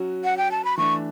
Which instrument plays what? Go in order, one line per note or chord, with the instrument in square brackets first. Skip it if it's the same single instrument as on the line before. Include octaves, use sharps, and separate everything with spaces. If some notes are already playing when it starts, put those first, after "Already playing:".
Already playing: [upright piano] F#3 C#4 F#4
[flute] F#5
G5
A5
B5
[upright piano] E3 A3 D4 [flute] C#6